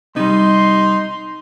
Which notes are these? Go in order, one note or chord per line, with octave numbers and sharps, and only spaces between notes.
C3 G3 D#4 C6